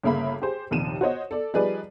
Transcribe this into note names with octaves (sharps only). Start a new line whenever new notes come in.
G1 C#3 A#3 E5 B5
G4 G#4 C5
A#1 D#2 C3 D#3 D#7 E7
F#4 C5 C#5 D#5
A4 D5
F3 G3 D#4 G#4 B4 D5